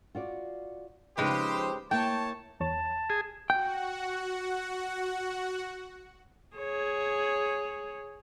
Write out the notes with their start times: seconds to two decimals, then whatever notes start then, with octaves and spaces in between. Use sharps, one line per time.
0.15 F4 F#4 D5
1.18 C#3 F3 G#3 C4 D#4 G4 B4 C5
1.91 A#3 E4 C#5 E5 G5 A5
2.60 E2 C#5 A5 A6
3.10 G#4
3.50 F#4 F#5 G5
6.56 G#4 C#5